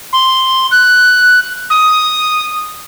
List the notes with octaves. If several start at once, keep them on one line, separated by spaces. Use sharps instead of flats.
C6
F#6
D#6